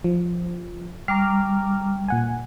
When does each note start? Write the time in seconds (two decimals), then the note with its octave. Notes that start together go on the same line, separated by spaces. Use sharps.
0.04 F3
1.08 G3 A#5 D6 F6
2.08 A#2 F#5 G#5